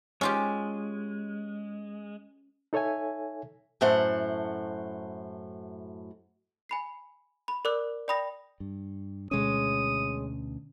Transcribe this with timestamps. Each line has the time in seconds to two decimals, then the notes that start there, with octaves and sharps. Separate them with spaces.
0.21 G#3 C#4 F4 G4
2.73 D#4 A4 C#5 E5 G#5
3.81 F#2 A2 A3 C5 F#5
6.69 G#5 B5 C7
7.48 B5
7.65 A#4 D5 D6 E6 F#6
8.08 D5 G5 B5 D#6 A#6
8.60 G2
9.31 D2 B2 G#3 C#4 C#5 D#6